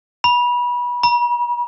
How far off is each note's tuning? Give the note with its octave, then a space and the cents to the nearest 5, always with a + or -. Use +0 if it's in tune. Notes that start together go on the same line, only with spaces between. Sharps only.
B5 -25
B5 -45